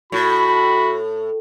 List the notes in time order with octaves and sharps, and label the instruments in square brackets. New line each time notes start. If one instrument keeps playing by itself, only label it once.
[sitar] A2 [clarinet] F#4 [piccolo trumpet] B5